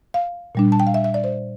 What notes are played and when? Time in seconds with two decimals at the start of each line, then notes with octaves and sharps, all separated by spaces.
0.14 F5
0.55 A#2 G3 D4
0.72 A5
0.80 G5
0.87 F5
0.94 E5
1.04 E5
1.14 D5
1.24 C5